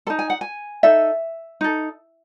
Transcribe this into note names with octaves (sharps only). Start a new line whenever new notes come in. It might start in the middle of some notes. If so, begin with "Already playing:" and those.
D#4 A4 A5
G#5
F#5
G#5
D#4 A4 E5
D#4 A4